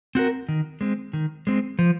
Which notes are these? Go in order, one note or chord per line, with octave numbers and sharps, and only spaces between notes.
C4 F#4 A#4
D#3
G#3 C4
D#3
G#3 C4
F3